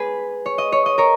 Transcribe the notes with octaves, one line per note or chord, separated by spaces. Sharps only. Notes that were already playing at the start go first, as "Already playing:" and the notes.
Already playing: G#4 B4
C#5
D#5
C#5
D#5
A#4 C#5